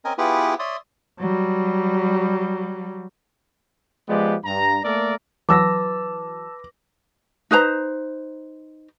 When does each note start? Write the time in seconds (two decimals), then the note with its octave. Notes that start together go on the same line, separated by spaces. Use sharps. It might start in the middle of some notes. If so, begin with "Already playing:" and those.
0.05 C4 C#4 A#4 D#5 G#5
0.18 B3 E4 F4 G4 G#4 B4
0.59 C#5 D5 E5 C6 D#6
1.19 F#3 G3
4.08 F3 G#3 B3 G4 D5
4.45 G2 A#5
4.84 A3 A#3 A4 A#4 D5
5.49 E3 F#3 B4 A5 D6 E6 A#6
7.51 D#4 B4 C5 A#5